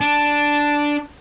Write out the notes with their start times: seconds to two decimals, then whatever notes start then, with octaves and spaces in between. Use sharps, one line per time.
0.01 D4 A5